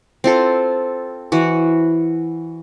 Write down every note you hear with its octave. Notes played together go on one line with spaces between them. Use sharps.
C4 F4 A4
E3 F#4